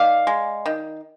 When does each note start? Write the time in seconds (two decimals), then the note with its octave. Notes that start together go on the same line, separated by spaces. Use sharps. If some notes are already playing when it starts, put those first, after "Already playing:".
Already playing: D#3 D5 F5
0.27 G#3
0.66 D#3